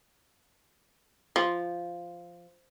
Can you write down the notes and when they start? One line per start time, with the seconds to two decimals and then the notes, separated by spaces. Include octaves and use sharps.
1.36 F3